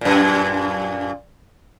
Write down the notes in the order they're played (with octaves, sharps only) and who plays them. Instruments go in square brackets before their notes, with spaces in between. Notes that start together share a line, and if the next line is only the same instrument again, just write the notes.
[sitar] F#2 A#2